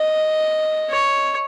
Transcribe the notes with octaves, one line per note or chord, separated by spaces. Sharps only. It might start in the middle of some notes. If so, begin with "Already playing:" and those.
Already playing: D#5
C#5